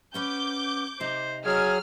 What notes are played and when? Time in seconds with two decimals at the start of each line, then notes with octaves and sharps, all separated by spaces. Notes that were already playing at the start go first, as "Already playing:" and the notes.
0.14 B3 C#4 B4 D6 G6
1.00 C3 D#4 C5
1.46 F#3 G#4 G#5 F6